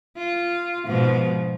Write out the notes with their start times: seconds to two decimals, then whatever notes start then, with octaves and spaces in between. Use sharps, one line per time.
0.17 F4
0.86 G#2 B2 F3